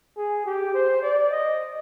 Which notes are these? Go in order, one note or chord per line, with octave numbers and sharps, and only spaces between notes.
G#4
G4
C5
D5
D#5